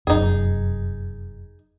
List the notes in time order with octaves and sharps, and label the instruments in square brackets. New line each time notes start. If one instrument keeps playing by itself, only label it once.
[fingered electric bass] F1 F#2 F#3 [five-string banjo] D#4 G#4